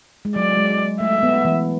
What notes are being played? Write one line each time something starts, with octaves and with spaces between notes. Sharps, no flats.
G#3
F#3 D5
G#3
A3 E5
B3
E3